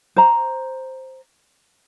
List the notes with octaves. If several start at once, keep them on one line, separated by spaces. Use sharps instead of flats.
C5 A#5